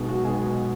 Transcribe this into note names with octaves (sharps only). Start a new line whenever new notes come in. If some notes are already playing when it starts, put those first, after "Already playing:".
Already playing: B1 B2 G#3 B3
F#4
B1 B2 G#3 B3 G#4